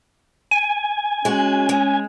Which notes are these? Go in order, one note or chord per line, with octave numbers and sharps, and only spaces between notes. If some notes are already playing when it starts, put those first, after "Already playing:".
G#5
G#3 C#4 F#4
G#3